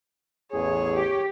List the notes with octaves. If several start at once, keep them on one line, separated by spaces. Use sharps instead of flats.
A1 E2 G#4 C#5
G4